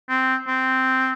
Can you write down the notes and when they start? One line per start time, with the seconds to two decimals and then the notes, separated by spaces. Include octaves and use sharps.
0.09 C4
0.47 C4